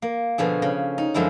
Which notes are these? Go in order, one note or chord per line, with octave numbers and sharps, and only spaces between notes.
A#3
B2 D3 F3 G#4
C#3
D#4
F#2 D3 F3 G#3 E4